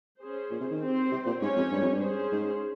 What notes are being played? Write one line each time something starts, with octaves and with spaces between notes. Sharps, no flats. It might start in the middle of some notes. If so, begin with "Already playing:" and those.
C#4 G#4 C5
A#2
C3
D#3
C4 G4 C5
C3
A#2
G#2 G#3 C#4 G4 C#5
F2
G2
F2
G2
C#4 G#4 C5
G#2